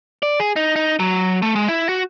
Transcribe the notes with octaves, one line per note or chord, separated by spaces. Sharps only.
D5
G#4
D#4
D#4
F#3
A3
G#3
E4
F#4